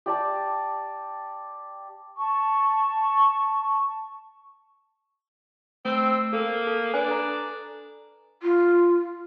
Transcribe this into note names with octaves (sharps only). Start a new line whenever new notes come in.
G4 D5 A5
A5 C#6
A3 C4 E6
A#3 A4
A4
D4 B4 G#5 F#6
A4 A#5
F4